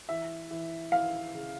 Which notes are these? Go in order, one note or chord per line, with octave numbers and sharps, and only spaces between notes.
E3 E5
E3
E3 F5
C#3